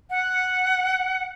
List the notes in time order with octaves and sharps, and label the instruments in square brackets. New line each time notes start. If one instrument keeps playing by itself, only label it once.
[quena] F#5